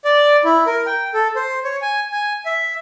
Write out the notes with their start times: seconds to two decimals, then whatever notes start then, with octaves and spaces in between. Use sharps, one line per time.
0.05 D5
0.45 E4
0.67 A#4
0.86 G5
1.14 A4
1.36 C5
1.64 C#5
1.82 G#5
2.12 G#5
2.46 E5